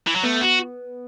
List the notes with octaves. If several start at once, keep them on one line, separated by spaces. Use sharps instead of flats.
E3
F#3
A3 B3
F#4